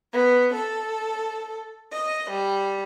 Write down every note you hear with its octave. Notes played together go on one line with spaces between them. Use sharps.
B3
A4
D#5
G3